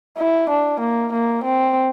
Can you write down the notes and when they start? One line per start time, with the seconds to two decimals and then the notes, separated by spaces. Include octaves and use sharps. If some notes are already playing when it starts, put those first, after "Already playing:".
0.18 E4
0.50 D4
0.81 A#3
1.13 A#3
1.44 C4